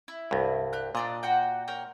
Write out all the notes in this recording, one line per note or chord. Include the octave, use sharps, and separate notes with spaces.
E4
C2 G2
G4 F#6
A#2 D4 D5 D#5
F#4 F#5 G5
A#4 C#5 G5